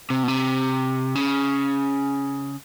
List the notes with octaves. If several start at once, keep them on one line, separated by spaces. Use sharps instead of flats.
C3
B2
C3
C#3